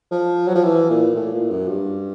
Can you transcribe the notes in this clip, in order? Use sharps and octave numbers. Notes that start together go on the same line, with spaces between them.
F3
F#3
F3
E3
A#2
A2
A#2
F#2
G2